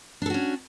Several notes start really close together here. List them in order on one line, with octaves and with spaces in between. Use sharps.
D4 A4 F#4 C#4